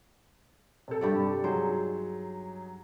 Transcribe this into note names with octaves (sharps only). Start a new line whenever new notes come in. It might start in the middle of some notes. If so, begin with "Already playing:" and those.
C3 A4
G2 G4 D5
F#3 D#4 G#4 C5